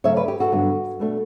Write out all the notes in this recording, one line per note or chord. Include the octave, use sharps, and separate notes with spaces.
C#3 F#3 A3 C#5 E5
B4 D5
G4
F#4 A4
G2 D3 F#3 B3
B2 A3 D4